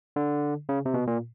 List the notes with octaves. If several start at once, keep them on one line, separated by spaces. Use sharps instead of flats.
D3
C#3
C3
B2
A#2